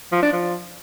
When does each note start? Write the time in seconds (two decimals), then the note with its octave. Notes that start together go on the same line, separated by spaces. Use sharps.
0.12 F3
0.22 D4
0.33 F3